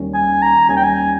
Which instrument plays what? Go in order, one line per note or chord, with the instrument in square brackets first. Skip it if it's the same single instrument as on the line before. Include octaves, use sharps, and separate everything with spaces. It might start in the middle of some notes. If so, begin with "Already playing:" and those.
Already playing: [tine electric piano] D#2 D#3 G3 C#4
[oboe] G#5
A#5
[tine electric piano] D#2 D#3 G3 C#4 [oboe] G#5
[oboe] G5
G#5